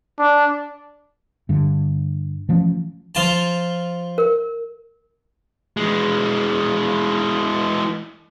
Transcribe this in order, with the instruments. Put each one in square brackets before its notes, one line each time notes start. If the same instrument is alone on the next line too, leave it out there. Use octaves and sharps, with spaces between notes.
[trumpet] D4
[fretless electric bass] G2 D3
E3 F3 A3 C#4
[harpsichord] F3 F4 A5
[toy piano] A#4
[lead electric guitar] E3 G#3